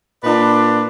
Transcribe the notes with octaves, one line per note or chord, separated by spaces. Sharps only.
A#2 D4 B4 D5